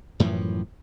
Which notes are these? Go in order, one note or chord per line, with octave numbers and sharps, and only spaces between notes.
F#2 A2 E3 F3